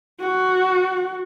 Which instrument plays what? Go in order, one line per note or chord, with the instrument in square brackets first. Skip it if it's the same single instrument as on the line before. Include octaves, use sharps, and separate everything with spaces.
[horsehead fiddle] F#4